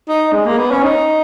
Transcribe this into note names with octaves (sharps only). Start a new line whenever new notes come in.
D#4
G#3
A#3
B3
C#4
D#4